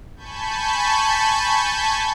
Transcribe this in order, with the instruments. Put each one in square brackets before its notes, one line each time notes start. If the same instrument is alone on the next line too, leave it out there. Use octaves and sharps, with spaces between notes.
[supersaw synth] G#5 A5 B5 C#6 G6